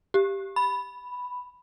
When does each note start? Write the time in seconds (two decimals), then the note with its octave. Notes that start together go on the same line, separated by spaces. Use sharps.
0.14 G4
0.56 B5